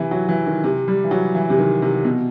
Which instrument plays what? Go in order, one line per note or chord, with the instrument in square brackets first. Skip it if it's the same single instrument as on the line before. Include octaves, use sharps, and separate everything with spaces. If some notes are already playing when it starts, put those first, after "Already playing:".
Already playing: [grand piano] C3 E3
F#3
E3
D#3
C3
G3
E3
F#3
E3
C3
D#3
C3
B2